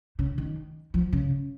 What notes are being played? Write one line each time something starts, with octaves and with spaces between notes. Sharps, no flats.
C#3
D#3
F3
C#3